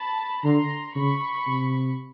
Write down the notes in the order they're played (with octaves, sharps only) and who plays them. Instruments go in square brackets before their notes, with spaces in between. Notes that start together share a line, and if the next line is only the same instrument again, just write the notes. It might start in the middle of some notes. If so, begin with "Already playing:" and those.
Already playing: [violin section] A5 B5
[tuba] D3 [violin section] A#5 C6
[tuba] C#3 [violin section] B5 C#6
[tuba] C3